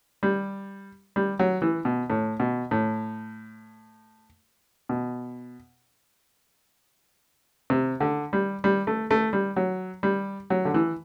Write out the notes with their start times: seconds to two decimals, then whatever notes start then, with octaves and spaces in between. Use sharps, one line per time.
0.23 G3
1.16 G3
1.39 F#3
1.62 E3
1.85 B2
2.10 A2
2.40 B2
2.71 A2
4.89 B2
7.70 C3
8.00 D3
8.33 G3
8.64 G3
8.87 A3
9.11 A3
9.33 G3
9.56 F#3
10.03 G3
10.50 F#3
10.65 D3
10.74 E3